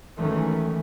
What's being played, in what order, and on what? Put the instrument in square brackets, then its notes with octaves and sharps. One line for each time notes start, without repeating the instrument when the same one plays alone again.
[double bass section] D#3 E3 F#3 G#3 A3 C#4